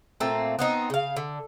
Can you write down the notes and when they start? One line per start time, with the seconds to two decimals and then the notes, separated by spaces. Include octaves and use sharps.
0.20 A#2 A3 A#3 C4
0.59 B3 C4 D#4
0.90 C#3 F5
1.16 D3